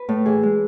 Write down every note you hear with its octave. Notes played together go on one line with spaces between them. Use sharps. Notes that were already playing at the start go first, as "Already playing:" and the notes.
Already playing: B4
A2
E3 G#4
G#3